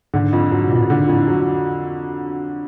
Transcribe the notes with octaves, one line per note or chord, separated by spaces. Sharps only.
G#2 D3
F2
G#2 F#3
B2
F2 A#2
A2
G#2 D3
F2 A2
F#3